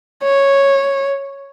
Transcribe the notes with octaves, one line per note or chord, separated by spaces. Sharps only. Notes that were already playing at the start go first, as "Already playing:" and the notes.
C#5